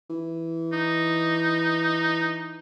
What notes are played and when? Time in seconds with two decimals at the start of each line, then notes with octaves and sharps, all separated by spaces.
0.10 E3
0.73 D#4